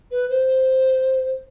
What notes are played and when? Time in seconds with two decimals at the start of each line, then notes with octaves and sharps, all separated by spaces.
0.11 B4
0.30 C5